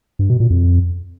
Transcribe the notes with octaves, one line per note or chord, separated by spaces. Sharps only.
G2
B2
A#2
F2